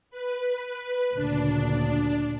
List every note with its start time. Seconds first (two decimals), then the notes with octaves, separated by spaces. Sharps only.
0.10 B4
1.15 D2 A#2 C#3 D4